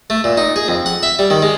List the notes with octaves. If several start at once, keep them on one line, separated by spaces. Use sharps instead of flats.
A3
A#2
D#4
G#4
F2
F#5
E5
G3
D#3
G#3